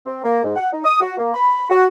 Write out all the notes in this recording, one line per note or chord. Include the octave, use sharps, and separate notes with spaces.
C4
A#3
G#2
F#5
D#4
D#6
F#4
A#3
B5
F#4